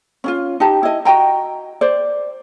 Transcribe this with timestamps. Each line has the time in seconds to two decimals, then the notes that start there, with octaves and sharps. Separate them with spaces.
0.24 C#4 E4 F4
0.60 D#4 G4 A5
0.83 E4 D#5
1.05 F#4 D#5 G5 A#5
1.81 C5 D5